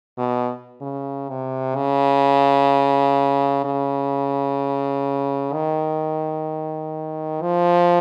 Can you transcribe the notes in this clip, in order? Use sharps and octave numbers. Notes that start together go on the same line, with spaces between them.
B2
C#3
C3
C#3
C#3
D#3
F3